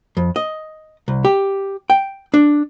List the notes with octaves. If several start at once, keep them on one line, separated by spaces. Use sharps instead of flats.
F2
D#5
C2
G4
G5
D4